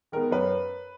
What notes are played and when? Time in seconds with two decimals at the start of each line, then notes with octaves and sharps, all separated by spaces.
0.12 D#3 G#3 B3 A#4
0.31 F#2 B4